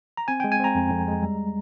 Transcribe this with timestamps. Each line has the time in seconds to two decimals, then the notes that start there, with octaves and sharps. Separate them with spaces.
0.17 A#5
0.28 C4 G#5
0.40 G#3 G5
0.52 G#5
0.60 C4 A#5
0.75 F2
0.91 F2
1.08 G#3
1.23 G3